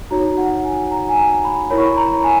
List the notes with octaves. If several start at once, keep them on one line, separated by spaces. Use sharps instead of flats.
D#4 F#4 C#5 A#5
F#5
G#5
A#5
G#5
A#5
B5
E4 A#4 C#5 B5
C#6
B5
A#5
G#5